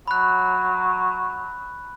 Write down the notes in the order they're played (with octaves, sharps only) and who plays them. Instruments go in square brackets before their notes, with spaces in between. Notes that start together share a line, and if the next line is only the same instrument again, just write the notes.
[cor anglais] F#3 [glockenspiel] B5 F#6